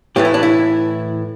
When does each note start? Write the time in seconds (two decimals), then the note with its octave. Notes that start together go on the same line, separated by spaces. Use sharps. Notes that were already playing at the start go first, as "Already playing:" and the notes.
0.16 A2 E3 A3 G4
0.25 E4
0.34 D4
0.43 E4